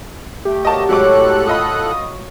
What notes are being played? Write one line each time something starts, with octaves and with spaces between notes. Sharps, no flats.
A3 G4
A#3 F#4 D5 D#5 A5
A2 F#3 G#3 A4 C#5 E5 D6 F#6
F4 D#5 B5 D#6